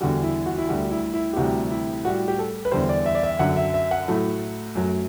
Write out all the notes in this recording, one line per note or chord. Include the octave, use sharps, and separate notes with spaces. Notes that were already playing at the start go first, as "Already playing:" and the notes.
E2 D3 G3 F#4
E4
F#4
E4
D2 D3 G3 F#4
E4
E4
G4
D2 C3 E3 G3 F#4
E4
A2 G3 F#4
G4
A4
B4
E2 D3 G3 C5
D5
E5
D5
E5
F#2 D3 F#3 F#5
E5
E5
F#5
A2 F#3 A3
F#2 F#3 A3